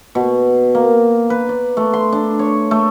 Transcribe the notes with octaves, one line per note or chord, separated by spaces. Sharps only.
B2
A#3
B4
D5
A3
C6
D4
C#5
A3